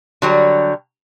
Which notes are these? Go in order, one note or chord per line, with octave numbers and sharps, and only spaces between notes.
D3 F#3 G3